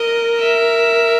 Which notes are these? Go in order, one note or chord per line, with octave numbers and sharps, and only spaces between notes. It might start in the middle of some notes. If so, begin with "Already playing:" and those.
Already playing: A#4 D#5
E5